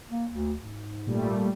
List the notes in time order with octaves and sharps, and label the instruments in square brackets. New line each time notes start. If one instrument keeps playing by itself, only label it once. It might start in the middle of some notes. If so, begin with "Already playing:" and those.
[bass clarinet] A#3
D2
G#2
[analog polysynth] A#2 G3 A3